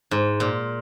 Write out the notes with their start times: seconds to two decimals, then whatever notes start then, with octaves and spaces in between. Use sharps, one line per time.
0.11 G#2
0.40 A#2